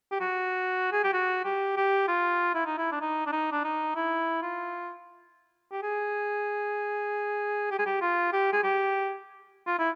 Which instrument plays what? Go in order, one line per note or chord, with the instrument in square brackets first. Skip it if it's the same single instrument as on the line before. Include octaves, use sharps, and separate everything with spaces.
[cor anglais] G4
F#4
G#4
G4
F#4
G4
G4
F4
E4
D#4
E4
D4
D#4
D4
D#4
D4
D#4
E4
F4
G4
G#4
G4
G#4
G4
F4
G4
G#4
G4
F4
E4